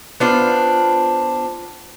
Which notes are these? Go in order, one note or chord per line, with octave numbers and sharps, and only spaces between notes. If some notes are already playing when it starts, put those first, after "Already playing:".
B3 D4 F4 C5